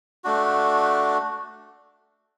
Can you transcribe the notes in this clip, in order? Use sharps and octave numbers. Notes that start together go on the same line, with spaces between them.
A3 D4 F#4